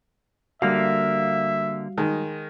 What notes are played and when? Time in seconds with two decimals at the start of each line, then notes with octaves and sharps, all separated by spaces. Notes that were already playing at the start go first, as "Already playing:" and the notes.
0.62 D3 G3 A#3 F#4 E5 F5
1.98 D#3 G#3